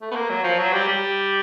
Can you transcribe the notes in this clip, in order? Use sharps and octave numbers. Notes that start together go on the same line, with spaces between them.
A3
B3
A#3
F#3
F3
F#3
G3
G3